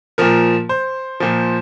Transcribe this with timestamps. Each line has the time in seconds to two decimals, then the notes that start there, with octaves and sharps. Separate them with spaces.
0.18 A#2 F3 A#4
0.69 C5
1.20 A#2 F3